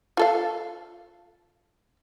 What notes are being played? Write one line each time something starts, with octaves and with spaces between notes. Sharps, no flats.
F4 A4 F5